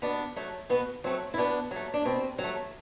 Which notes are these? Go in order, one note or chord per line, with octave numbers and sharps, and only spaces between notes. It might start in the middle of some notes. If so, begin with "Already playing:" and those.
B2 B3 D4
F#3 A3
B2 B3
F#3 A3 C4
E4
B2 B3 D4
F#3 A3
D4
B2 C4
F#3
A3